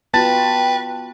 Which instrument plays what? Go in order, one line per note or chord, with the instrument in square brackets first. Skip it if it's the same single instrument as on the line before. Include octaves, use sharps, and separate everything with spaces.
[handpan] B3 F4 F#4 [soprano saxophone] B4 [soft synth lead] G5 [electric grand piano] A5 A6